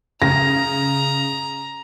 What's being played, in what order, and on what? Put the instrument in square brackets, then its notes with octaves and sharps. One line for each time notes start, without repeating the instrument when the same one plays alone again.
[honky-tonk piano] C#3 [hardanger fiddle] A#5 [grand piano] A#6